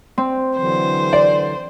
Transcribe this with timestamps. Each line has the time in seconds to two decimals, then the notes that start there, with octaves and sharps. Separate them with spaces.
0.18 C4
0.57 D3 E3 F#3 C5
1.13 D5